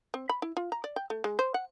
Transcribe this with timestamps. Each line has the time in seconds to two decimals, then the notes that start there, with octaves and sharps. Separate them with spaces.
0.14 C4
0.29 B5
0.42 E4
0.57 F4
0.72 A#5
0.84 D5
0.96 G5
1.10 A3
1.24 G#3
1.39 C5
1.54 F#5